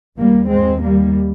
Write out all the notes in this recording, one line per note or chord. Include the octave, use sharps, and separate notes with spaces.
D#2 G3 A#3
G#3 C4
G3 A#3